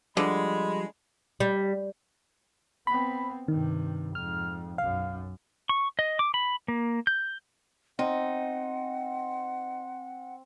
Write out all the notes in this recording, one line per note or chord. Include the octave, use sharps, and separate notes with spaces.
D3 F3 G3 G#3 B5
G3
B3 C4 B5
G2 C3 D#3
F2 G#2 F6
B1 F#2 F5
C#6
D#5
D6
B5
A#3
G6
C4 D#4 F#5